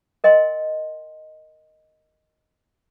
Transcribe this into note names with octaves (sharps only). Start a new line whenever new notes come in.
A#4 D#5 G5 C6